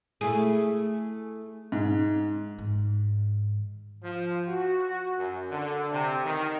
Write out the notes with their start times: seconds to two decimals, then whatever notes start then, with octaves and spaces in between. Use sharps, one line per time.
0.21 A3 E4 G#4
1.72 G#2
2.58 G#2 D#3
4.03 F3
4.48 F#4
5.18 F#2
5.51 D3
5.92 C3
6.25 D#3